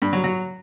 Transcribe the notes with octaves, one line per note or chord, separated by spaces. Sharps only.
G2
F#3
F#3